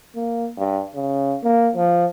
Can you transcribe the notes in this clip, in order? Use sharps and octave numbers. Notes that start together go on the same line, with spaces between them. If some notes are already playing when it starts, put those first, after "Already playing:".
A#3
G2
C#3
A#3
F3